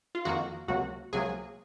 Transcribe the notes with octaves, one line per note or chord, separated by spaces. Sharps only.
F4
F2 D#3 A#3 F#4
C#2 C3 F#3 A#3 F#4
C#2 C3 F#3 A#3 G#4